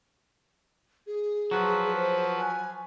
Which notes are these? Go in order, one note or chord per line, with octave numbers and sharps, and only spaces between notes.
G#4
F3 F#3 B4
C5
G#5